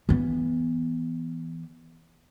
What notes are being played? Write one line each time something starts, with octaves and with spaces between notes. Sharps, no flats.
E3 B3